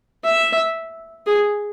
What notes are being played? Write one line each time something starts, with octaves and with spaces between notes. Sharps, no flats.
E5
G#4